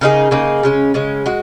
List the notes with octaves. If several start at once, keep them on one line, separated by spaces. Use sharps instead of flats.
C#3 A#3 D#4 G#4
C#3 A#3 D#4 G#4
C#3 G#3 C#4
C#3 G#3 C#4
G#3 F#4